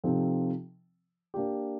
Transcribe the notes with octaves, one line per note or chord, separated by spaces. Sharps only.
C3 F3 C4 D#4 A4
A#3 D4 G4